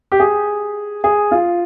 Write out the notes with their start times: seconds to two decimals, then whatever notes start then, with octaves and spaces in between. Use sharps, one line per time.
0.12 G4
0.20 G#4
1.04 G#4
1.31 F4